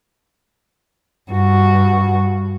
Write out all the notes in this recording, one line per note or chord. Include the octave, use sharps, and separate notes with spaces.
G2 F#4